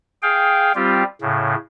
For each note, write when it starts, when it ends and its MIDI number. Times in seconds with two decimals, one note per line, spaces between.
0.22 0.72 68
0.22 0.72 77
0.22 0.72 79
0.75 1.04 55
0.75 1.04 60
0.75 1.04 65
0.75 1.04 67
1.21 1.55 45
1.21 1.55 49